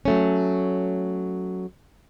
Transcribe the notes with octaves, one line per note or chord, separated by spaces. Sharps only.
F#3 A3 C#4